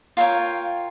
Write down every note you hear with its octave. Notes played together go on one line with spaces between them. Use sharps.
F4 A#4 C#5 G5